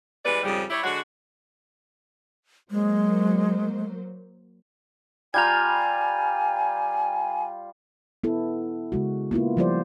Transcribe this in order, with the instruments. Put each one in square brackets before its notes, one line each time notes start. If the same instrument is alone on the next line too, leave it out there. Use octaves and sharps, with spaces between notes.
[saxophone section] E3 G3 G#3 B4 D5
F2 G#2 C#3 G3
G3 E4 G4 C#5
D3 G#3 F#4
[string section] F#3 A#3 C5 [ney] G#3
[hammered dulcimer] G3 F4 [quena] G#5 [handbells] A#5 G6 G#6
[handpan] B3 E4 A4
C#3 G#3 F#4
A#3 B3 E4 F4
F3 G3 F4 G4 C5 D5